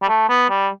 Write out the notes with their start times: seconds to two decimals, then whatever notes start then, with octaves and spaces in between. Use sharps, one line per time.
0.02 G3
0.09 A3
0.29 B3
0.50 G3